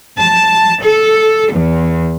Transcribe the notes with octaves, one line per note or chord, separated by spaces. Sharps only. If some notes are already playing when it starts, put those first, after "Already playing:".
A5
A4
E2